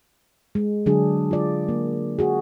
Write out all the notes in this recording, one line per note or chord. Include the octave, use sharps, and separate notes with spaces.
G#3
D3 F#3 D4 G#4
F4 D5
A#3
F#4 G#4